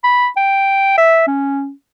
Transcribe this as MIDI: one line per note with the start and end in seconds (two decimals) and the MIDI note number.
0.04 0.28 83
0.37 0.97 79
0.98 1.23 76
1.27 1.71 61